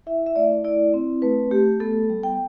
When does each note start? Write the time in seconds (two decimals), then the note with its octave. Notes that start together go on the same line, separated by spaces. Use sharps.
0.06 E4 E5
0.26 E5
0.36 A3 D5
0.64 E4 D5
0.94 C4
1.22 A3 B4
1.51 A3 G4
1.80 B3 A4
2.10 G3
2.23 G5